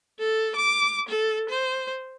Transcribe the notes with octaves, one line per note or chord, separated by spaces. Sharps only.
A4
D6
A4
C5